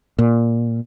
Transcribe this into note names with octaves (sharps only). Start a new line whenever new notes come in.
A#2